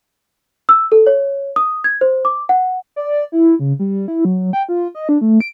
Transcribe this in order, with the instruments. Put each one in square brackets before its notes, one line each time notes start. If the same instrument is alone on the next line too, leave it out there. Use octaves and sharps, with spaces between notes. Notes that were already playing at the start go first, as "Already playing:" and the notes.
[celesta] E6
A4
C#5
D#6
G#6
C5
D6
F#5
[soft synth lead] D5
E4
C#3
G3
E4
F#3
G5
F4
D#5
D4
A3
D7